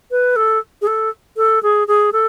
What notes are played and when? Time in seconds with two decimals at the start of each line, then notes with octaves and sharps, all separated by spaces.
0.11 B4
0.36 A4
0.82 G#4
0.87 A4
1.37 A4
1.63 G#4
1.88 G#4
2.12 A4